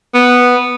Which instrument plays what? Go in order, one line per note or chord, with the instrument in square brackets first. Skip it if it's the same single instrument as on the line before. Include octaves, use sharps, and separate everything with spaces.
[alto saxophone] B3